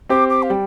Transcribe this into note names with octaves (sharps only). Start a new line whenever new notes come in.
C4 G4 C5 D6
D6
F5
G3 G5